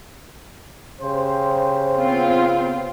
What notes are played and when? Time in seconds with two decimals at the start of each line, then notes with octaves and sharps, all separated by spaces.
1.00 C#3 G4 C5
1.98 B3 C4 F4